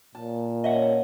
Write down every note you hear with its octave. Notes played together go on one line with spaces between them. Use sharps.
A#2 A5
C#4 D#5 E5 F#5